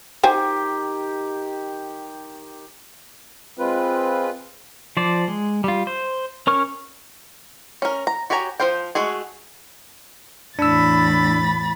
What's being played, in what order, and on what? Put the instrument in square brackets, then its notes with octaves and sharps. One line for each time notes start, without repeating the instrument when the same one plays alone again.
[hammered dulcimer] D#3 G4 [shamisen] C5 G5 G#5
[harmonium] G#3 F4 B4 [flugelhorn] C4
[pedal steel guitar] F3 C5 D5
G#3
G3 F4
C5
C#4 A#4 C#6 F6
[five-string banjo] C#4 A#4
A#5
F#4 G4 C#5 G#5 A#5
F3 F4 C5 F5 G5
G#3 A3 F#4 G#4
[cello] E2 A2 [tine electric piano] D4 E6 [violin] B5 A6